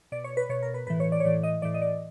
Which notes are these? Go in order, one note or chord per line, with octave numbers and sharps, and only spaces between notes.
B2 D5
C#5
B4
B2 C#5
A#4
B4
A2 E3 B4
C#5
D5
C#5
A2 E3 D5
D#5
A2 E3 D5
D#5
D5